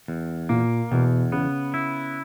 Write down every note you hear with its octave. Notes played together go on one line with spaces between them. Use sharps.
E2
A#2 A#3
E2 B2
C#3 B3
E4